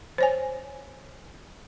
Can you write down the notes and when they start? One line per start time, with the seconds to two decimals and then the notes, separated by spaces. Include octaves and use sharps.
0.18 C5 C#5 G#5